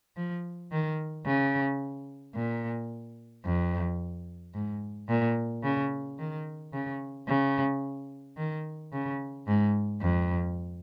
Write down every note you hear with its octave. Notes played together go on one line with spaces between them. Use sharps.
F3
D#3
C#3
A#2
F2
G#2
A#2
C#3
D#3
C#3
C#3
D#3
C#3
G#2
F2